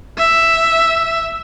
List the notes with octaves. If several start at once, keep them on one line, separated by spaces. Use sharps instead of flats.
E5